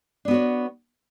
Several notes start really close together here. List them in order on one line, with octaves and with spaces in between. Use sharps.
D4 B3 F#4 C#5